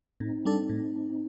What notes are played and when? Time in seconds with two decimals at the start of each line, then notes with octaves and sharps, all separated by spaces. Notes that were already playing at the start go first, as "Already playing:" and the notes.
0.20 A2 C4 D#4
0.45 G3 D4 A4
0.69 A2